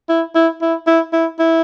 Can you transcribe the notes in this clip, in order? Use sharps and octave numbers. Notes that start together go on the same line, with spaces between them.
E4
E4
E4
E4
E4
E4